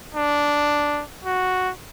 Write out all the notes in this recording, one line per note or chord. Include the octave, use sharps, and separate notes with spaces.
D4
F#4